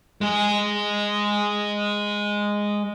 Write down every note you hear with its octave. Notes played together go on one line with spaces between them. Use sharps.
G#3 G#4